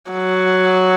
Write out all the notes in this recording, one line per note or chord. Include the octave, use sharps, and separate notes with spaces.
F#3